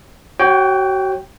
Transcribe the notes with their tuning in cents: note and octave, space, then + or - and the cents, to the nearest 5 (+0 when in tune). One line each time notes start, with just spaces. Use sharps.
F#4 +35 C#5 -25 G5 +0